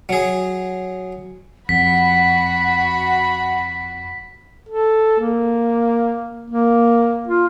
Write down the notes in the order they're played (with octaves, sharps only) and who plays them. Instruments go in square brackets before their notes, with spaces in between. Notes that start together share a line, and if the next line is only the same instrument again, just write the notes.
[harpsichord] F#3 G#4
[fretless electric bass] F2 [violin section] F#4 B5 [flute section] F#5 [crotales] B6
[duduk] A4
A#3
A#3
F4